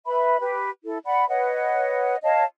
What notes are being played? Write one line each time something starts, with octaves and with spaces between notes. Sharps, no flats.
B4 E5 B5
G4 B4
E4 A4
D5 F#5 B5
B4 C#5 D#5 F#5
C#5 D#5 F5 A5